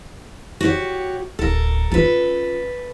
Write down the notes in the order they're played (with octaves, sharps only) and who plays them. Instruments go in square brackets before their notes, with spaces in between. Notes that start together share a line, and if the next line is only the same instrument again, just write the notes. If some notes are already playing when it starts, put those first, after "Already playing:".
[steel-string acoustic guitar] F#4 G4 C#5
[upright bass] D1 [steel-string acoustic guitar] A4 A#4
[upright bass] C#4 F4 [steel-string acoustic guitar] A4 B4